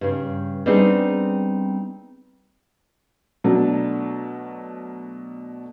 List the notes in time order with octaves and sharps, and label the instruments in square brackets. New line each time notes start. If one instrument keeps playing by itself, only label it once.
[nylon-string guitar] G2 C#3
G3 B3 C4 D4 D#4 G#4
[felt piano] B2 F#3 A3 D4